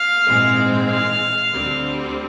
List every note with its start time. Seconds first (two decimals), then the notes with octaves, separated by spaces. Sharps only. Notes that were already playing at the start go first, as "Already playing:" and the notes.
Already playing: F5
0.27 A#1 G#2 E3 G#3 C4
0.90 F5
1.52 D2 D3 G3 C4